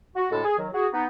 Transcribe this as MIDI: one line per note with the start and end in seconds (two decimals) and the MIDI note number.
0.16 0.28 66
0.31 0.43 38
0.31 0.43 45
0.31 0.43 56
0.31 0.43 69
0.44 0.57 68
0.57 0.67 51
0.57 0.67 54
0.72 0.87 66
0.72 0.87 68
0.92 1.06 59
0.92 1.06 63